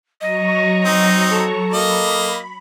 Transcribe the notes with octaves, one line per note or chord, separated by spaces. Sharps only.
F#3 D#5 A#5 C#6
C4 D#4
A4
A#3 D#5 B5